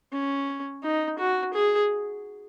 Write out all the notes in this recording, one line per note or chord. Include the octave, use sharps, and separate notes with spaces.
C#4
D#4
F#4
G#4